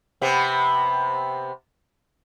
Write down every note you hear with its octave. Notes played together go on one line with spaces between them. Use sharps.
C3 B3